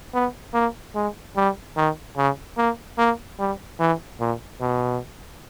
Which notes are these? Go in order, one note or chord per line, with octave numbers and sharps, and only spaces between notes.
B3
A#3
G#3
G3
D#3
C#3
A#3
A#3
G3
E3
A#2
B2